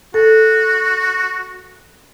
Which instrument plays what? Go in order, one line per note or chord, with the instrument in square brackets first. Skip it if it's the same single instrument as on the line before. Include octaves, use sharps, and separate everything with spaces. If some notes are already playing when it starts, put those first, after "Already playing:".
[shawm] F#4 [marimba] A4